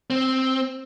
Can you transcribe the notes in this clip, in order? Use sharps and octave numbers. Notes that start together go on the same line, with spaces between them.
C4